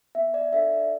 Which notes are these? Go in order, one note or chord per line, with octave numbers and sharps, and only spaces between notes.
B3 E5
D5
D4 A4 E5
D5